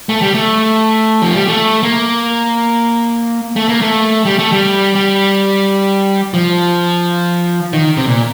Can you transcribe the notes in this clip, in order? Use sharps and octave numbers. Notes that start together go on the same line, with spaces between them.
A3
G3
A3
F3
G3
A3
A#3
A3
A#3
A3
G3
A3
G3
G3
F3
D#3
C3
A#2